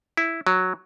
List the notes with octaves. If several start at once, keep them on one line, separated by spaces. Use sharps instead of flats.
E4
F#3